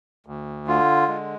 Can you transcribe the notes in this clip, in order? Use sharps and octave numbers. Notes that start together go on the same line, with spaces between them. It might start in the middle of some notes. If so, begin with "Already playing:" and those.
D2
D3 F4
G#3